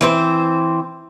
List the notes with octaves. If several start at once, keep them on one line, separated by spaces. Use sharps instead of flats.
E3 C4 C5